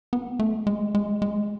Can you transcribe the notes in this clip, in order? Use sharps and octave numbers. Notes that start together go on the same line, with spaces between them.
B3
A3
G#3
G#3
G#3